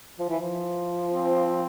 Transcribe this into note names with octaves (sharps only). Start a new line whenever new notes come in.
F3
E3
F3
C4